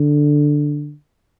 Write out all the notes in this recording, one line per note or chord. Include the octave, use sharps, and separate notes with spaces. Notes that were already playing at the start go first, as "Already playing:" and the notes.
Already playing: D3